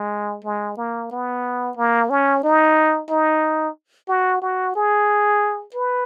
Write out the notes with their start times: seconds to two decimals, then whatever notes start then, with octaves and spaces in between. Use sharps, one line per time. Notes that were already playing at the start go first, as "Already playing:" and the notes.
Already playing: G#3
0.44 G#3
0.77 A#3
1.11 B3
1.77 A#3
2.10 C#4
2.43 D#4
3.09 D#4
4.08 F#4
4.42 F#4
4.76 G#4
5.74 B4